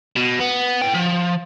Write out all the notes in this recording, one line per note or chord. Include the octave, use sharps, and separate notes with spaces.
B2
B3
A2 G5
F3